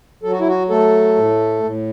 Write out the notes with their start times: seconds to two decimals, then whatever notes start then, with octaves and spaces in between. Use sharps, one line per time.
0.23 F#3 A4
0.31 F#4
0.40 E4
0.47 F#4
0.70 A3 A4
1.16 A2
1.63 A2